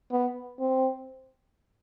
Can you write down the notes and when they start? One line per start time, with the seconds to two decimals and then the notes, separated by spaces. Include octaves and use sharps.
0.12 B3
0.60 C4